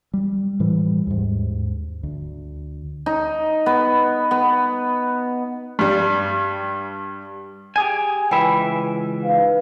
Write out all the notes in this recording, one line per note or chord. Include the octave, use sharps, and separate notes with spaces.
G3
A2 E3 G3
D#2 G#2
D2
D#4
B3
B3
G2 G3
G4 G#4 G#5
C#2 E3 E5 G5 G#5 B5
D#4 B4 F5